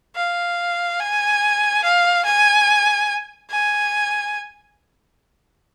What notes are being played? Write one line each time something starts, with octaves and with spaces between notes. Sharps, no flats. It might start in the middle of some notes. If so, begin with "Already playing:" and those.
F5
G#5
F5
G#5
G#5